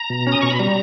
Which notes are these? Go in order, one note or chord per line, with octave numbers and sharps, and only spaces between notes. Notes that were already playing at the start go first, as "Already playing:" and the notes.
Already playing: A#5
B2
C#4
D#6
B2 C#6
B5
G3 A#5